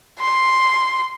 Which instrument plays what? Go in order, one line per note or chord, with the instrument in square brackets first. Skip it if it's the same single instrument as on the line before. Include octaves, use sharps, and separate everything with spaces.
[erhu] C6